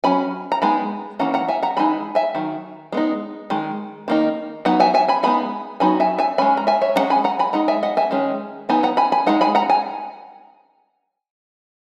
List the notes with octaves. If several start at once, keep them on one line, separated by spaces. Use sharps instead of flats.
F#3 C#4 G#5 B5
A#5
G#3 B3 D#4 G#5 B5
E3 A#3 C#4 F#5 A#5
F#5 A#5
E5 G#5
F#5 A#5
E3 G#3 D#4 G#5 B5
E5 G#5
D#3 F#3
G#3 B3 D#4
D#3 G#3
D#3 A#3 D#4
F#3 B3 D#4 F#5
E5 G#5
E5 G#5
G#5 B5
G#3 B3 D#4 G#5 B5
F#3 B3 D#4 G#5 B5
E5 G#5
E5 G#5
G#3 C#4 G#5 B5
A#5
E5 G#5
C#5 E5
E3 G#3 C#4 F#5 A#5
G#5 B5
F#5 A#5
G#5 B5
G#3 D#4 F#5 A#5
E5 G#5
D#5 F#5
E5 G#5
D#3 G#3 C#4
E3 B3 D#4 G#5
F#5 A#5
G#5 B5
G#5 B5
G#3 D#4 F#5 A#5
G#5 B5
F#5 A#5
G#5